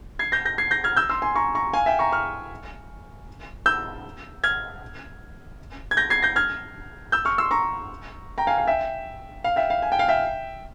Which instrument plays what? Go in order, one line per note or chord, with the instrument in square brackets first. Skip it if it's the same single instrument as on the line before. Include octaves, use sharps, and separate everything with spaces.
[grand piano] G#6 C7
G6 A#6
G6 A#6
G#6 C7
G6 A#6
F6 G#6
E6 G6
C6 E6
G#5 C6
A#5 C#6
A#5 C#6
F5 G#5
E5 G5
A#5 C#6
C#6 F6
E6 G6
F6 G#6
G#6
G6 A#6
G#6 C7
G6 A#6
F6 G#6
E6 G6
C#6 F6
C6 E6
A#5 C#6
G5 A#5
F5 G#5
F5
E5 G5
F5
E5 G5
F5
G#5
G5
F5
E5 G5